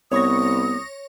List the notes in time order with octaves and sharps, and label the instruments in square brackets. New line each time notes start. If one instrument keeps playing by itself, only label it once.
[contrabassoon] C2 [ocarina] B3 [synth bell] C#5 C#6 A#6 [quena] D#6